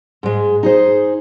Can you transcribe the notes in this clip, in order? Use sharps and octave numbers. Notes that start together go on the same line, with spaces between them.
G#2 G#3
D#4 G#4 C5